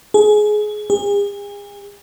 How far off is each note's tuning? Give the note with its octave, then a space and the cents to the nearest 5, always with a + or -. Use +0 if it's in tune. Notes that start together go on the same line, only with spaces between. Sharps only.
G#4 +20
G#4 -40